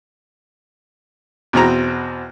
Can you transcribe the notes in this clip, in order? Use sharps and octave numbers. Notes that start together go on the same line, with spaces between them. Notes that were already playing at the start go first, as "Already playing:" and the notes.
E2 B2 C4 A#5